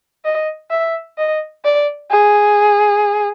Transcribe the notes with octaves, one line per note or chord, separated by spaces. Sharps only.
D#5
E5
D#5
D5
G#4